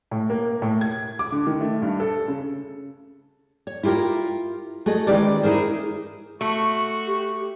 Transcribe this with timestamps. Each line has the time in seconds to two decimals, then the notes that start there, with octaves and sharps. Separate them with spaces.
0.11 A2
0.30 A#3
0.62 A2
0.81 G#6
1.19 D6
1.32 D3
1.47 D#3
1.61 A3
1.82 G2
2.00 A4
2.28 C#3
3.67 C#5
3.83 E4 F4 G4 A4 A#4
4.86 A3 F#4 G#4 D#5
5.07 D#3 E3 G#3 C#4 G4 D5
5.43 D#4 E4 G#4 A#4 C5
6.41 A3 F#4
7.07 G4